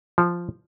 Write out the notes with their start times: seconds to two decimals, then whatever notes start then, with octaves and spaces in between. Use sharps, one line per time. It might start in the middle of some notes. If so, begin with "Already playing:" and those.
0.18 F3